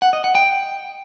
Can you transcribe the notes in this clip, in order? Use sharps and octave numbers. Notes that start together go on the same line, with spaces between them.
F#5
D#5
F#5
G5